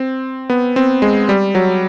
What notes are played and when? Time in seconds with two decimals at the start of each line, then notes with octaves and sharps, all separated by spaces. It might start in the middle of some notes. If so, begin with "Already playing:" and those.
Already playing: C4
0.50 B3
0.76 C4
1.02 G#3
1.29 G3
1.55 F#3